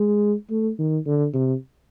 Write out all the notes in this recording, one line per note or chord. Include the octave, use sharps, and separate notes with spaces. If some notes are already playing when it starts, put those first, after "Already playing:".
Already playing: G#3
A3
D#3
D3
C3